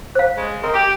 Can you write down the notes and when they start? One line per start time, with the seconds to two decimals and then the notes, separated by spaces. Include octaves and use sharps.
0.15 C5 F5
0.37 C#3 G#3
0.62 C4 A#4 D#5
0.74 G4